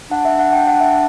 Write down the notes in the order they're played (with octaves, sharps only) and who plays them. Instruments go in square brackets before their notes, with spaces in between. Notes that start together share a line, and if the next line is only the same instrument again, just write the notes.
[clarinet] D4 [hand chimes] F#5
[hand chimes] E5
F#5
G5
F#5
E5